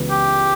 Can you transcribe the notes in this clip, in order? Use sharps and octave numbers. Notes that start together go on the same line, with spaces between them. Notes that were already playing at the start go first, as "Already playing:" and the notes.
Already playing: C#2 C#3 E3 B3 F#4
G4